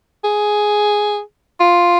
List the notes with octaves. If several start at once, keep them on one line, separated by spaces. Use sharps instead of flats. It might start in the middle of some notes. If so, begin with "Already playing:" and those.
G#4
F4